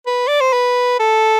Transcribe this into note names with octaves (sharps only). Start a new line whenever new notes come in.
B4
D5
C5
B4
A4